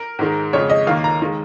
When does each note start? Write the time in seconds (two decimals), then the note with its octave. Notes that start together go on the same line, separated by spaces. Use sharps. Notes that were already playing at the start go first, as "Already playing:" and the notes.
Already playing: A#4
0.19 G#2 D#3 G#3
0.53 F2 C#3 G#3 C#5
0.70 D#5
0.87 D#2 D#3 A#3 F5
1.04 A#5
1.22 D#3 G#3